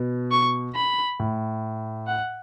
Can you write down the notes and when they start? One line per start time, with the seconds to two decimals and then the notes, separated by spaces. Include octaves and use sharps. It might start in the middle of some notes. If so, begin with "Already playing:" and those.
Already playing: B2
0.32 C#6
0.75 B5
1.20 A2
2.07 F#5